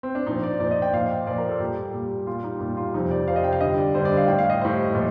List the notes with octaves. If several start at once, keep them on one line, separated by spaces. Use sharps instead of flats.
C4
D4
A#2 F3 D#4
D5
A#2 F3 D5
D#5
G5
A#2 F3 F5
A#2 F3 D5
A#4
A4
A#2 G3 G4
A#2 G3
A#2 G3 F4
D#4
A#2 G3 D#4
F4
F2 C3 F3 D#4
D5
F2 C3 F3 F5
D#5
G5
F5
G2 D3 G3 D#5
D5
G2 D3 G3 C5
D5
F5
A2 G3 G5
F5
D#5
A2 G3 C5
A#2 F3